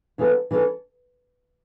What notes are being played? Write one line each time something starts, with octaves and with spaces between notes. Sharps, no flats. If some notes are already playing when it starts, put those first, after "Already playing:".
C#3 E3 B3 A4
E3 C#4 F#4 A4